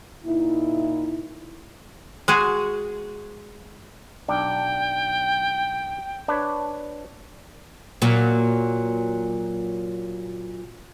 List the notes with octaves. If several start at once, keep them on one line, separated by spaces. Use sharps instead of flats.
A#2 D#4 E4
G#3 F#4 G#4
B1 D4 G5
D4 B4 C#5
A#2 F#3